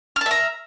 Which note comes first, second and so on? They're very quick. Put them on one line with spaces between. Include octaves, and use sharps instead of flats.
F6 A5 E5 A#5